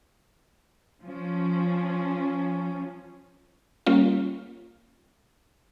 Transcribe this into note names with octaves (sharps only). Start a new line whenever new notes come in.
F3 C#4
G3 A#3 C#4 F4